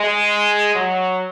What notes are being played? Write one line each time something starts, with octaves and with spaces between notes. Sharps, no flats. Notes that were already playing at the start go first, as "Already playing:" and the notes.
Already playing: G#3
F#3